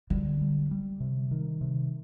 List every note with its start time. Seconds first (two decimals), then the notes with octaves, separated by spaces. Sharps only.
0.10 D3 G3
0.41 G3
0.71 G3
1.00 C3
1.31 D#3
1.61 C3